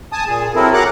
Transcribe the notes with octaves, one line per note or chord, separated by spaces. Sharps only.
G#5 A5 D#6
A#2 G#4
F#3 C4 E4 A4 A#4
G#4 A#4 F#5 A#5 D6 F#6